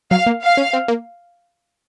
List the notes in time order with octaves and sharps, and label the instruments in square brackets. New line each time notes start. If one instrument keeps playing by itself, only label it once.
[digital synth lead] F#3 [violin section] F5
[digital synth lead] A#3
[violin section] F5
[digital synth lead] C#4
C4
A#3